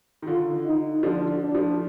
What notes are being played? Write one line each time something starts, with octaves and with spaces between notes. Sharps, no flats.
D#3
D3 F4
D#4
D3 F3 D4
D4
F3 A3